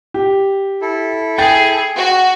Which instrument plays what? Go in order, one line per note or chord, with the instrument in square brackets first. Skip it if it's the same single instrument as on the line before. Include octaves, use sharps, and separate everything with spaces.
[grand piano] G4
[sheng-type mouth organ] E4 A4
[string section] G#4 [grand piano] G5 A6
[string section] F#4